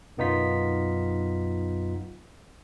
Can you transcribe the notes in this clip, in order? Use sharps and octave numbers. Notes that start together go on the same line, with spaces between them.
B1 F#2 B3 D#4 F4 B6